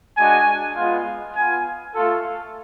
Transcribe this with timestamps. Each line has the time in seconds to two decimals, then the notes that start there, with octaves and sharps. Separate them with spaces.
0.16 G#3 D4 F#4 G#5
0.76 G#3 B3 F4
1.35 B3 F4 G#5
1.93 A3 F4 A4